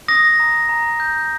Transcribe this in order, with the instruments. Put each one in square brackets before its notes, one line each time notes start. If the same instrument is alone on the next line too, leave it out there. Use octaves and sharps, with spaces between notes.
[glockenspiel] D#6 A#6
A#5
A#5
G6